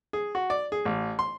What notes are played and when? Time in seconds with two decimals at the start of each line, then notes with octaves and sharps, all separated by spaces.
0.13 G#4
0.35 F#4
0.50 D5
0.72 G#4
0.85 A1
1.19 C6